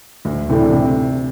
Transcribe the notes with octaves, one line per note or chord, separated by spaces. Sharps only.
D2
C3 E3 A3 D4
C3